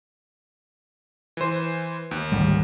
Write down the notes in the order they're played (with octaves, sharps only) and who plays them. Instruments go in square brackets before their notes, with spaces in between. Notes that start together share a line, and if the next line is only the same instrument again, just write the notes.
[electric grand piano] E3 C5
D#2
[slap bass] G#1 D2 G3